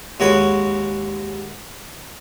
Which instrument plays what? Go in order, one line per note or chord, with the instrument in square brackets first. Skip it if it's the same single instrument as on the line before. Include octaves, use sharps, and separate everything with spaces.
[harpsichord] D#2 G#3 F#4 G#4 C#5 B5